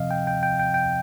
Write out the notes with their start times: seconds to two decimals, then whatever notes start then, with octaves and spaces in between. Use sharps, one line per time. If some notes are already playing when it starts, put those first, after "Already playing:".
Already playing: C3 F3 C4 D#5 F5
0.11 G5
0.27 G5
0.43 G5
0.60 G5
0.74 G5